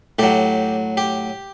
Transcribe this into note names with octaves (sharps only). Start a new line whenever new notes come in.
A2 F#3 G4
G4